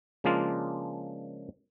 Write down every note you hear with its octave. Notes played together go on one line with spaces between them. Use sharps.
C#3 F3 G#3 A#3 D4 F4